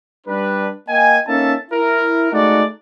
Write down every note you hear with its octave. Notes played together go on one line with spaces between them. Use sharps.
G3 D4 B4
A#3 D#5 G5 G#5
A#3 C#4 D#4 A4 E5 A5
E4 A#4
G#3 A3 D#4 F#4 D5